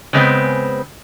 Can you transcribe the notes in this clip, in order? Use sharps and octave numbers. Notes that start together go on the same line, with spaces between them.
C#3 G#3 B3 C4